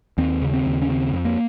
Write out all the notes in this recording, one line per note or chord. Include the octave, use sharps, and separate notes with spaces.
D#2 C4
C#3
C4
D#2
C#4
C#3 C4
F2
A#3